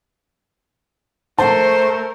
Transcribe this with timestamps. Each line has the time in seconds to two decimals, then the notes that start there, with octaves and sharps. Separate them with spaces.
1.39 A3 A#4 C5 A5